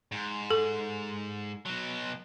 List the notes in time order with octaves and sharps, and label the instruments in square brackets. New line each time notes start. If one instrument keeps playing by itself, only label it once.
[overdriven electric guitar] G#2
[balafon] A4
[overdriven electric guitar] B2 F#3